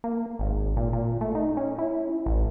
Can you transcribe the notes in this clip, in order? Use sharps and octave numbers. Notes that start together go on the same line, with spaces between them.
A#3
G#1
A#2
A#2
A3
D#4
C#4
E4
A1